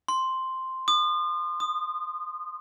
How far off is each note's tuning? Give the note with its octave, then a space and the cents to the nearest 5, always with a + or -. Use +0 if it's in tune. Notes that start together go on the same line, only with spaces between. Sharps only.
C6 +0
D#6 -40
D#6 -20